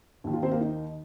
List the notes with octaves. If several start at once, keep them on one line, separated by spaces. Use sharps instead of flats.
D#2 D#3
F4
C4 C5
A#3 A#4
D#4